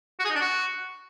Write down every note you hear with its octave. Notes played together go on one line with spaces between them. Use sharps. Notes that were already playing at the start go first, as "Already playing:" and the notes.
F#4
G#4
D#4
D4
F#4